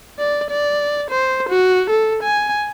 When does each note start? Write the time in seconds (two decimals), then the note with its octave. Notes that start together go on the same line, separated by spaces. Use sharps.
0.19 D5
0.50 D5
1.11 C5
1.49 F#4
1.90 A4
2.23 G#5